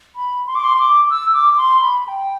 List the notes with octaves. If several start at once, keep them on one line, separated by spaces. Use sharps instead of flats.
B5
C6
D6
C6
D6
E6
D6
C6
B5
B5
G5